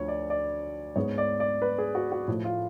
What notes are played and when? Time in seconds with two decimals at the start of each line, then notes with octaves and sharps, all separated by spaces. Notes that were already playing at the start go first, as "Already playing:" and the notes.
Already playing: D2 D3 F3 C#5
0.08 D5
0.30 D5
0.96 G#2 G#3 B3 C#5
1.18 D5
1.40 D5
1.62 B4
1.78 G#4
1.95 F#4
2.12 F#4
2.28 A2 F3 A3
2.44 F4